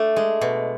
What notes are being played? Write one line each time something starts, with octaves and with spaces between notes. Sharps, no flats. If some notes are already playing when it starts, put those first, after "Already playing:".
Already playing: A3 D4
G#3
B2